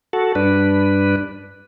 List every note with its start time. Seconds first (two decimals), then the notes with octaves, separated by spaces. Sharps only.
0.13 F#4 A4
0.35 G2 D4 B4